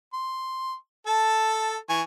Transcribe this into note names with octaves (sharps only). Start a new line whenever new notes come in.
C6
A4 A5
E3 G#5 C#6